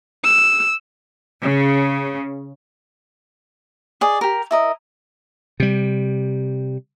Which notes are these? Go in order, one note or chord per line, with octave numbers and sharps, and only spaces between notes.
E6
C#3
G#4 D5 D#5
G4 A#4
E4 A#4 D#5
C3 G3